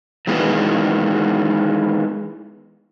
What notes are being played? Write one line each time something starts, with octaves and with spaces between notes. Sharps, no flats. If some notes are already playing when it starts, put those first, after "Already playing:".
D#3 E3 G#3 B3